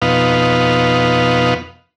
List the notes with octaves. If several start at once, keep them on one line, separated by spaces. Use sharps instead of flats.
F2 B2 B3 D#4 F5